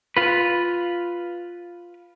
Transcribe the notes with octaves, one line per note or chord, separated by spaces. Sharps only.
F4 B4